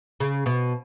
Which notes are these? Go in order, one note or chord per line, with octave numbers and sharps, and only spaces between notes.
C#3
B2